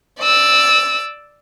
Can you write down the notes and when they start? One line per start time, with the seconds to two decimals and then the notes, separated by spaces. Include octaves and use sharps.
0.20 D5 E6